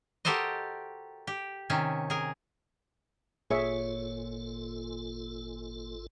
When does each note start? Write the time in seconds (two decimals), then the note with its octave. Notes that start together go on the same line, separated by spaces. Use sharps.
0.25 F#4 G4 A4 A#4 C5 D#5
1.27 G4
1.70 C3 D#3 C#4
2.10 G#4 A#4
3.51 G#1 A#2 F4 G#4 A4 C#5 E5